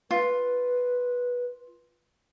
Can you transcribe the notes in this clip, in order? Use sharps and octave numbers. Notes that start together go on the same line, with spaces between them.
F4 B4